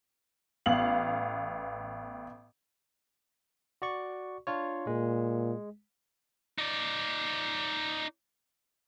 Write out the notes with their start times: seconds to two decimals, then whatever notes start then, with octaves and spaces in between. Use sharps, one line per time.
0.66 A1 B3 F5 F#7
3.82 F#4 D5 C#6
4.47 D4 F4 C#5
4.87 A#2 G#3
6.58 D#4 D5